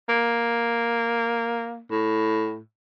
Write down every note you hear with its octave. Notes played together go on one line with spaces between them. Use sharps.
A#3
A2